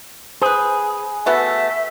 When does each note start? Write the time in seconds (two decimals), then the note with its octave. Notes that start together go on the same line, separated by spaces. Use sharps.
0.42 G#4 B4 C5
1.26 A3 B3 F#4 E5